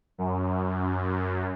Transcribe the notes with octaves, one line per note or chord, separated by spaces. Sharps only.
F#2